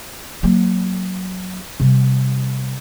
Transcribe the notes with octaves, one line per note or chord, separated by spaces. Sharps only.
F#3 A#3
C3 G3